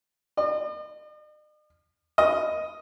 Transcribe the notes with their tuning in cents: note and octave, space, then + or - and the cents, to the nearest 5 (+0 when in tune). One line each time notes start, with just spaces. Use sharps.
D#5 -45
D#5 +5